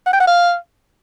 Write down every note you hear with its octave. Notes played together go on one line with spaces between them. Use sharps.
F#5
G5
F#5
F5